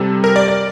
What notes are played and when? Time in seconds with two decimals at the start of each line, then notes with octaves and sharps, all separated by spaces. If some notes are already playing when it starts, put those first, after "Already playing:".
Already playing: C3 G3 A4
0.24 A#4
0.36 D5
0.48 D5